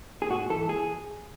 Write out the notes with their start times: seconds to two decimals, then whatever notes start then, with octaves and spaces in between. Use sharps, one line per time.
0.22 G#4
0.30 G#2 F#4
0.50 E3 A4
0.69 G#4